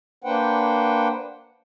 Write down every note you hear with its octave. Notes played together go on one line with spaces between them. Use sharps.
A#3 D4 B4 C5 F#5 G5